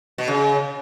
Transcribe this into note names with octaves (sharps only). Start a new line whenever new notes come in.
B2
C#3